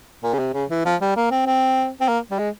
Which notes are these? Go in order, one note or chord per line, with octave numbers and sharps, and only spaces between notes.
A#2
C#3
C3
C#3
E3
F3
G3
A#3
C4
C4
C4
A#3
G3
G#3